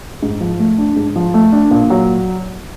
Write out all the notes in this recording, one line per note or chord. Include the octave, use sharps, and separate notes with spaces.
G#2
F3
A3
D4
G#2
F3
A3
D4
A#2
F#3